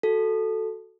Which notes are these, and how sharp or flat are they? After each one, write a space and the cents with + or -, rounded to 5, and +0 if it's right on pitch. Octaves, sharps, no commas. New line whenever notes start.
F#4 +0 A4 +0